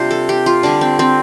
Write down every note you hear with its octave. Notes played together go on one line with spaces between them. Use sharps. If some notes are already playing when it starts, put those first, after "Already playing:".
Already playing: C3 G3 D4 F4 C5
A4
G4
F4
D3 G3 D4
C4
C4